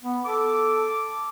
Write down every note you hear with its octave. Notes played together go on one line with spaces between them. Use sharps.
B3
A4 D6